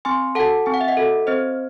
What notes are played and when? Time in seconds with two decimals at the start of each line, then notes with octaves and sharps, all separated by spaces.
0.05 C4 G#5 C6
0.35 F#4 A4 F#5 A5
0.66 C4 G#5
0.74 F#5
0.81 E5
0.88 D#5 F#5
0.97 F#4 A4
1.27 C4 C5 D#5